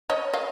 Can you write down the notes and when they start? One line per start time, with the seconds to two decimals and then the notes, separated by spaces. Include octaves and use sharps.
0.10 C#5 D#5
0.34 D#5 F5